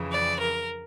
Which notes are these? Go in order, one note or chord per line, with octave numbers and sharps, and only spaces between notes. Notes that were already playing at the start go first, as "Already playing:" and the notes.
Already playing: F2 C#3 E3
D5
A#4